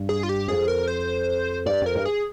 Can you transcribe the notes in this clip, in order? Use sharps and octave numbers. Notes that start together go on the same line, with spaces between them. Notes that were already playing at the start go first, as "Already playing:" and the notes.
Already playing: G2
G#4
F4
G4
F2 G#4
A#4
C5
G2 D5
F2 A#4
G2
G#4